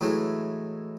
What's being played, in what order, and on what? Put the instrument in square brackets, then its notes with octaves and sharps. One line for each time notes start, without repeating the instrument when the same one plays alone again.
[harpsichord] A2 E3 F#3 G#3